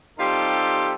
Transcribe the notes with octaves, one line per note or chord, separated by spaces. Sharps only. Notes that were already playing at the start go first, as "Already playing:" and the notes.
G3 C4 D#4 F4 G4 A4